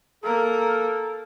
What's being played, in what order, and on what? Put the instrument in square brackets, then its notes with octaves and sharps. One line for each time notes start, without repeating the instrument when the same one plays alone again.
[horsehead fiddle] A#3 A#4 [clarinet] A4